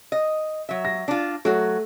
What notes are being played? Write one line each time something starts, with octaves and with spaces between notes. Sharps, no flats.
D#5
F#3 E5
A#6
D4 F4
F#3 A3 F#4